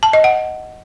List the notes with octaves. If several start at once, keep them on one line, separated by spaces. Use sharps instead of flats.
A5
D#5
F#5